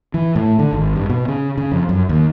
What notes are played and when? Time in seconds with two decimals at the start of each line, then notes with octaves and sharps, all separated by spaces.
0.14 E3
0.35 A2
0.59 D3
0.73 G#1
0.96 G2
1.10 B2
1.28 C#3
1.58 C#3
1.72 F2
1.89 F#2
2.09 D#2